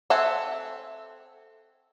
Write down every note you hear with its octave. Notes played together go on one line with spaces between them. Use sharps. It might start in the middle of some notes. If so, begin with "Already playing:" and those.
C4 A4 E5 F#5 G#5